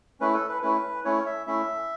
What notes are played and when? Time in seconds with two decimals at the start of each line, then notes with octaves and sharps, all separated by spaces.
0.20 A3 C#4 E4 B4
0.34 A4
0.49 B4
0.62 A3 C#4 E4 B4
1.04 A3 C#4 E4 C#5
1.26 E5
1.46 A3 C#4 E4 E5